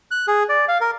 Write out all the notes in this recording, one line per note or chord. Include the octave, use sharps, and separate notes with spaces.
F#6
G#4
D5
F5
A#4